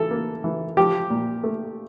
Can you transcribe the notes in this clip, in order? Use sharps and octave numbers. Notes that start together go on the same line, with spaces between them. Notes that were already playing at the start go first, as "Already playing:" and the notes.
Already playing: E3 A4
A#3
E3
F3 G4
A#2
A3